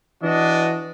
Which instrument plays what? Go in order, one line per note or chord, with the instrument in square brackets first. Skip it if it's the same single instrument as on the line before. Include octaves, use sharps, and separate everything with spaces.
[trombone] E3 [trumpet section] D4 F#4 D#5